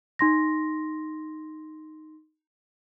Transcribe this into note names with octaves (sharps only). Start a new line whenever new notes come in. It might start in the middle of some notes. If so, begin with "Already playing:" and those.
D#4 C6 A#6